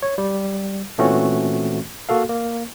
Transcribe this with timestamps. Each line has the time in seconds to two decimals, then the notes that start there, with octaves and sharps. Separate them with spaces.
0.02 C#5
0.18 G3
0.98 A#2 E3 A3 C4 C#4 F#4
2.09 A#3 F#4 A4 F5
2.29 A#3